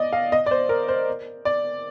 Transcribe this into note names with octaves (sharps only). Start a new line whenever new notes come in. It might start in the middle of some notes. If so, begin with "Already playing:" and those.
Already playing: D5 D#5
F5
D#5
D5
C5
A#4
C5
D5